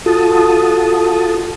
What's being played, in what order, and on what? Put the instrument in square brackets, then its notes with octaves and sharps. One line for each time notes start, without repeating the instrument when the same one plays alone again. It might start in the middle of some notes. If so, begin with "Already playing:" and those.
[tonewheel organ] F4 F#4 A4 A5 D#6